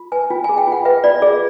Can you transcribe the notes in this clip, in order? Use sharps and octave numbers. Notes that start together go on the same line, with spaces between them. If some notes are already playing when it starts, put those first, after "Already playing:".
Already playing: F4
B4 G#5
F4 G5
G#5
G#4
G5
F4 F#5
B4 E5
F4 D5
G#4 D5